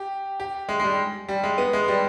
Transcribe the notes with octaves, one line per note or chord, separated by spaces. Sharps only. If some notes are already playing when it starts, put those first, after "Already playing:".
Already playing: G4
G4
G#3
G#3
G3
G3
G#3
B3
G#3
G3